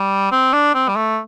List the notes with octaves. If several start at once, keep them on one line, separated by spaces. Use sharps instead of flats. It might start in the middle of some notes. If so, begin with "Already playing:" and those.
Already playing: G3
C4
D4
C4
G3
A3